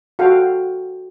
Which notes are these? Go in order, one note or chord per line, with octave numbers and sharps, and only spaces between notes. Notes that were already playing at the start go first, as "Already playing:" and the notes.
F#4 A4 F5 G5